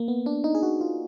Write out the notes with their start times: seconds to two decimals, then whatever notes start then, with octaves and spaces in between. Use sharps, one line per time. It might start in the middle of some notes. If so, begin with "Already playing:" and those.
Already playing: A#3
0.08 B3
0.26 D4
0.44 D#4
0.55 G#4
0.63 F#4
0.81 F4